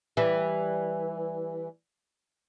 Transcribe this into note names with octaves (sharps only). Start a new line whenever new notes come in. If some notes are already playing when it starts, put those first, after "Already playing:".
E3 G3